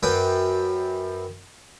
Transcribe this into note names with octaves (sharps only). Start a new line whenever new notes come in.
F#2 B4 G5